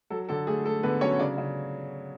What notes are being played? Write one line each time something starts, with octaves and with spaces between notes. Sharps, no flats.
F#3 A4
D3 A4
A3 G#4
A3 A4
D3 B3 B4
F#3 C#4 C#5
C#3 D4 D5
C#3